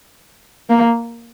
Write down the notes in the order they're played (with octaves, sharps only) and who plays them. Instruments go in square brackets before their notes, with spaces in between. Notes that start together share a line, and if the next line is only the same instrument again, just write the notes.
[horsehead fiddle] A#3